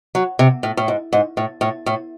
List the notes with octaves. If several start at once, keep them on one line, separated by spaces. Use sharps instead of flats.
F#3
C3
A2
A2
G#2
G#2
A2
A2
A2